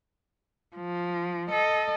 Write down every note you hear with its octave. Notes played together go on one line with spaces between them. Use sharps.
F3
A4 D#5